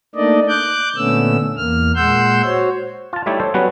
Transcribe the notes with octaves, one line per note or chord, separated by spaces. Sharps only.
A3 A#3 D4 D#4 D5 D#5
D6 F#6 G6
A#2 D3 A3 B3 C#4 E6
E2 A#3 F6
A#2 G#3 F#5 C6 E6 G6
F#4 C5 C#5
F4 A5
G3 A3 D#4 E4 G4 C#5
A4 C5 C#5
F#3 G3 B3 C#4 F#4 B4